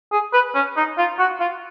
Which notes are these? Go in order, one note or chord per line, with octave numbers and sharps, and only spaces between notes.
G#4
B4
C#4
D#4
F4
F#4
F4